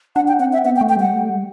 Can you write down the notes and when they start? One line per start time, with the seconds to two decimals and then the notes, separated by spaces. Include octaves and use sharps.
0.16 D4 F#5
0.28 G5
0.40 C4 F#5
0.53 E5
0.64 B3 F#5
0.76 G5
0.81 A3
0.89 G5
0.97 G3 F#5
1.13 A3
1.29 G3